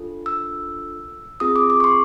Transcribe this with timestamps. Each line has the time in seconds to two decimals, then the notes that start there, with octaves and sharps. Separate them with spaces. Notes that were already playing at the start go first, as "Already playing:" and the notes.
Already playing: D4 F4 A4
0.26 E6
1.40 C4 F4 G#4 D#6
1.56 D6
1.70 D6
1.80 C#6
1.84 C6